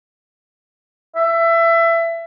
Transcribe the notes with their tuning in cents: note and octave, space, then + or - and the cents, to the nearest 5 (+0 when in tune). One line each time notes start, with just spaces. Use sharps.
E5 +20